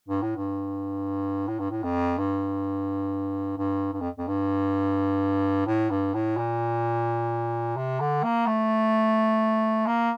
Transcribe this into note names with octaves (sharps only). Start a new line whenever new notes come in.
G2
A2
G2
A2
G2
A2
F2
G2
G2
G2
F2
F2
G2
A2
G2
A2
A#2
C3
D3
A#3
A3
A#3